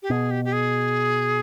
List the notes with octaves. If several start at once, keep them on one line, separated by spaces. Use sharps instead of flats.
G4
B2 G#4
G4
G4
G#4